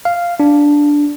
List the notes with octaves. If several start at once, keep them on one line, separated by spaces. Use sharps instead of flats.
F5
D4